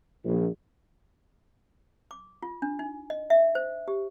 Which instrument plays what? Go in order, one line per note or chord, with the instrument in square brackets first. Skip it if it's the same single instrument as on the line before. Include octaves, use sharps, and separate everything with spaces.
[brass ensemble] A#1
[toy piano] D6
F4
D4
D#4
D#5
E5
C5
G4